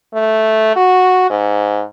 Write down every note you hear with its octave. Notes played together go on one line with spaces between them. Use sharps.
A3
F#4
G#2